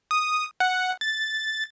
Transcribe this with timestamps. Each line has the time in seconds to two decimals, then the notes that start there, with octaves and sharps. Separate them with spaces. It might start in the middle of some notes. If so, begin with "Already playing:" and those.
0.11 D#6
0.60 F#5
1.01 A6